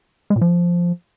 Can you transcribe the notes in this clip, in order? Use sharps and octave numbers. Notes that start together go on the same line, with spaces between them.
G#3
A#2
F3